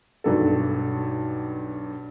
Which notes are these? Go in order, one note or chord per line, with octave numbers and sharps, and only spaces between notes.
B1 G2 A4